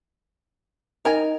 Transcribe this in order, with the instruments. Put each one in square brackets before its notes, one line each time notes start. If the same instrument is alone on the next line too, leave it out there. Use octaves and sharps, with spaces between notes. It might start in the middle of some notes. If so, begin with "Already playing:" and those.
[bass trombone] D#4 [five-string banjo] A#4 G#5 A#5